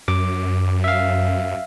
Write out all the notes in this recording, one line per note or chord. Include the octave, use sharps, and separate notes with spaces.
F#2 D6
E5 F5